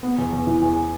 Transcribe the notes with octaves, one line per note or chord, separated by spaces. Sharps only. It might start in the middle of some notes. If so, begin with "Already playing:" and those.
B3
E2
E2
E3
E2